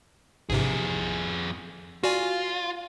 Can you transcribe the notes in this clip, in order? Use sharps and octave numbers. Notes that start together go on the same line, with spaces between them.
A1 F2 G#2 C3 G#4
F4 F#4 D5 G#5